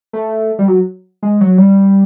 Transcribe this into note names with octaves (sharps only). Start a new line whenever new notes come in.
A3
G3
F#3
G#3
F#3
G3